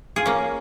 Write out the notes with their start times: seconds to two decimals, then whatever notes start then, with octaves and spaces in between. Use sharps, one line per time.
0.16 F4 G#4
0.26 A#3 C#4